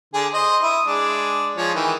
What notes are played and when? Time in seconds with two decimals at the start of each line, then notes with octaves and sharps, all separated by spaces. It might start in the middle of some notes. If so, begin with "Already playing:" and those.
0.14 D3 G#4
0.34 C5 D#5
0.62 E4 D#6
0.86 G#3 D4
1.57 F3 G#3 C#5
1.75 D#3 E3